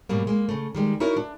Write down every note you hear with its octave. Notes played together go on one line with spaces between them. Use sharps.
G#2 B2 F#3 G3 A#3
G#3 A#3
C#3 A3
D#3 G3 G#3
D#4 E4 F#4 A#4 C#5
D4